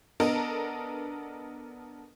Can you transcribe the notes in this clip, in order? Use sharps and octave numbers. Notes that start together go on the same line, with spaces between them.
B3 D4 A4 A#4 D#5